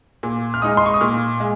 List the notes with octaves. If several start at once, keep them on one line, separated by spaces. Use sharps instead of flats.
A#2
F6
G#3 D#4 D#6
C6
C#6
D#6
A#2 F6
G#3